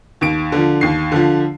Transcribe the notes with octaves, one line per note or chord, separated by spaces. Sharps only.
D#2 D7
D3 F3
D#2 C7
D3 F3